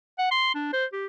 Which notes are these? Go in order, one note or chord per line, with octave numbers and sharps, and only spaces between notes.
F#5
C6
D4
C5
G4